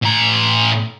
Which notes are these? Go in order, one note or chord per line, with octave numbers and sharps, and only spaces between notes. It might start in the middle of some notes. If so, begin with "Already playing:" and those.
A2 A#5